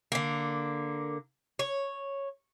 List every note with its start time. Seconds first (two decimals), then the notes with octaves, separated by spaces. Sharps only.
0.12 D3 A#3
1.59 C#5